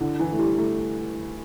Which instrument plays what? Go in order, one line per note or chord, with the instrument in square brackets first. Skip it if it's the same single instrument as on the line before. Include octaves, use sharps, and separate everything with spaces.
[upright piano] D3 [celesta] E4
[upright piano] E3 [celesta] E4
[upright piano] A3
[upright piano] G3 [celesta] E4
[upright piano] A3 [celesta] E4